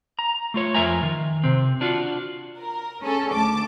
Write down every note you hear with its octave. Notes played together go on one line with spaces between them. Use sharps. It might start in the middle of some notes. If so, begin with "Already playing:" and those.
A#5
A3 F4 C#5
F2 F4 A#4 E5 G#5 A#5
D#3
C3 C4
D4 F4 F#4
A#4
C#4 G#4 A4
D2 A5 D6